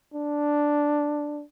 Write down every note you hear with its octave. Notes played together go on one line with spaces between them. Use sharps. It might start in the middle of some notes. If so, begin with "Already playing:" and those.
D4